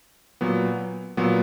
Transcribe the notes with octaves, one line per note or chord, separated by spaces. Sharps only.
A#2 F#3 B3
A#2 F#3 B3